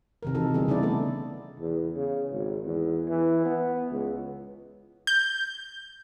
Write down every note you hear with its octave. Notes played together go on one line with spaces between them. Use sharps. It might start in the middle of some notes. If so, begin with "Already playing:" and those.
C3 D#3 A#4
E3 D#4 F#4 A4
D3 G3 B3 G#4
C#3 B3 D#4 E4 D5
A3 A4
E2
C#3
G#1
E2
E3
B3
C#2
G6